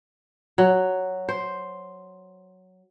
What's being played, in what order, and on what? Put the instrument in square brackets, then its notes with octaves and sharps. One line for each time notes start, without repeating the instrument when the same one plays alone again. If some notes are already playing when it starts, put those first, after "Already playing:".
[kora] F#3
C5